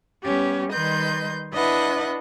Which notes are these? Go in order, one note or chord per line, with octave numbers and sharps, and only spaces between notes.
G3 B3 C#4 G4
D#3 G3 B4 D#5 C6 G6
D4 E4 B4 D#5 E5 F#5